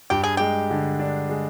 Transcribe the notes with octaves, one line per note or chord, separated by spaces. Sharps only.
G2 G4
G#4
G#3 G4
D3
D4
G#3